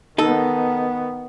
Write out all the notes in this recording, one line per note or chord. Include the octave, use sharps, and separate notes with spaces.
D#3 B3 D#4 A4